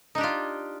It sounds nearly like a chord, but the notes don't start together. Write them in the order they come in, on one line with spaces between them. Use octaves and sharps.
D#4 D4 G4 F4